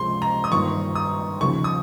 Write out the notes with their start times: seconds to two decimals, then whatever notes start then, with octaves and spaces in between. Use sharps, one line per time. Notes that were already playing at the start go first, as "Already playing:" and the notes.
Already playing: C#2 C3 F3 G#3 C6
0.22 A#5
0.44 D#6
0.51 G2 D#3 A#3 F4 C#6
0.95 D#6
1.41 D#2 C#3 F3 C#6
1.64 D#6